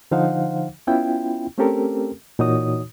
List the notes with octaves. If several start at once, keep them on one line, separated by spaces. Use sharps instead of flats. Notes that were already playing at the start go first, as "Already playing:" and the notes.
D3 F3 D#4 C5 F5 F#5
B3 C#4 E4 F4 G5
A3 C4 C#4 G4 A4 A#4
A#2 E3 D#4 F#4 C#5 D#6